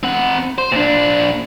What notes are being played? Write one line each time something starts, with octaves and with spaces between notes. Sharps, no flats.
C4 F#5
C5
A#2 D4